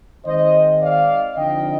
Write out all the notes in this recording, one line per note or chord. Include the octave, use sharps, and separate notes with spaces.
D#3 G#3 C4 C5 D#5
D5 F5
D3 F3 C4 D#4 D#5 G5